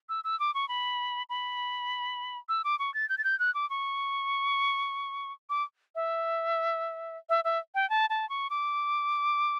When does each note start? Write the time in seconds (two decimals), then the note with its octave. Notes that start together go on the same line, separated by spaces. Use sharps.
0.09 E6
0.24 E6
0.40 D6
0.54 C#6
0.69 B5
1.30 B5
2.49 E6
2.64 D6
2.79 C#6
2.94 A6
3.09 G6
3.18 A6
3.24 G6
3.39 F#6
3.54 D6
3.70 C#6
5.50 D6
5.95 E5
7.29 E5
7.44 E5
7.75 G5
7.90 A5
8.10 A5
8.29 C#6
8.50 D6